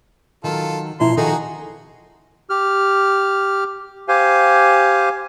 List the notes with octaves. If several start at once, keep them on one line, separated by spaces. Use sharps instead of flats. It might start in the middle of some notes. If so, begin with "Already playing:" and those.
D#3 F#3 F4 A4
B2 F3 E4 A#5 C6
D#3 F3 D#4 F#4 G#4 A4
G4 F6
G4 C5 F5 G#5